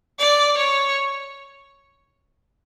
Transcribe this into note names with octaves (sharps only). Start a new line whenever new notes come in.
D5
C#5